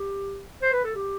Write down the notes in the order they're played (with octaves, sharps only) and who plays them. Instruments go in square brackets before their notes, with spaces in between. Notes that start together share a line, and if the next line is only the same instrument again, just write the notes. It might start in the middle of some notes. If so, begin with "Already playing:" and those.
Already playing: [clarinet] G4
C5
B4
A4
G4